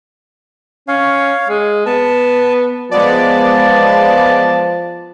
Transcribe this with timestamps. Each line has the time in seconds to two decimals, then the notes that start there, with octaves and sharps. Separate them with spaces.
0.88 C#4 C#5 F5
1.48 G#3
1.86 B3 A5
2.91 F3 G#3 B3 D5 A5